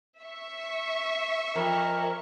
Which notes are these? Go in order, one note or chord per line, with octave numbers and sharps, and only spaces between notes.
E5 C#6
F2 A#4